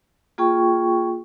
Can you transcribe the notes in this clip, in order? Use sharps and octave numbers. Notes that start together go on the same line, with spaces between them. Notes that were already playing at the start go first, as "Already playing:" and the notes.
A#3 F4 G#4 G5 C#6